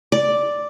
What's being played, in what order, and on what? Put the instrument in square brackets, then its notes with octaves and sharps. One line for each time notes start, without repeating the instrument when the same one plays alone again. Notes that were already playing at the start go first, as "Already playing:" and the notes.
[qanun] D5